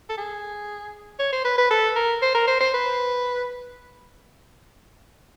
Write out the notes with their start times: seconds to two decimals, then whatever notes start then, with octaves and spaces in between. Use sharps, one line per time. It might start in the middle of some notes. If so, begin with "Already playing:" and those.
0.10 A4
0.18 G#4
1.20 C#5
1.33 C5
1.45 B4
1.58 B4
1.71 A4
1.96 A#4
2.22 C5
2.35 A#4
2.47 C5
2.60 C5
2.74 B4